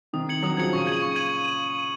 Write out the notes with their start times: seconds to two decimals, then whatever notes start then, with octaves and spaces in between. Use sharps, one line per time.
0.13 C3 D#3 D#6
0.29 G#6 C#7 F#7
0.42 D#3 F#3 D#6
0.57 C#3 F3 G#6 C#7 F#7
0.73 A#2 C#3 C#6
0.87 G#6 D#7 F#7
1.02 C#6
1.16 G#6 D#7 F#7